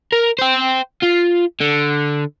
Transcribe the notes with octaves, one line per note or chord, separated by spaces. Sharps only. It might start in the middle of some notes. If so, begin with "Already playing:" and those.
A#4
C5 G5
F4
D3